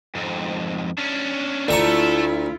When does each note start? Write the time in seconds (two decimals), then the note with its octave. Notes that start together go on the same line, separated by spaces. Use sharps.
0.15 F2 G#2
0.98 C#4 D4
1.68 D2 A3 E4 F4 A4 A#5 C#6